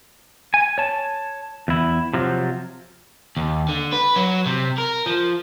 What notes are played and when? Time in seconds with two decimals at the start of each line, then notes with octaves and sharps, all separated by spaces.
0.54 G#5
0.78 C#5 A5
1.68 E2 E4
2.14 C3 F3 F#3
3.37 D#2
3.69 D3
3.92 B4
4.16 F#3
4.46 C3
4.78 A#4
5.06 F3